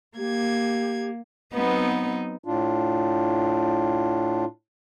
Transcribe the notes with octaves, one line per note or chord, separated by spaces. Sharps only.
A#3 G4 G#6
F#3 B3 C4 D#4
A2 D4 F4